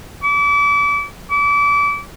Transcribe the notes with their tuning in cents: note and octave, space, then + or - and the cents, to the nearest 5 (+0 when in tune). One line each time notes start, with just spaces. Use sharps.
D6 -35
D6 -30